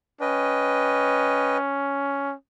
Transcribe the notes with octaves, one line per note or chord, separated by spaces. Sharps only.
C#4 B4 D#5 G5